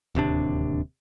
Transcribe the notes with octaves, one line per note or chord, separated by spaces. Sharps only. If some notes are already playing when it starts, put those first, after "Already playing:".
D1 D#2 C3 D4